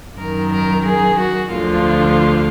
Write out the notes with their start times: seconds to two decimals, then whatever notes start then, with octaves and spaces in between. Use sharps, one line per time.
0.17 F#2 D#3 A#4
0.52 A#4
0.86 G#4
1.19 F#4
1.52 D2 D3 F3 F4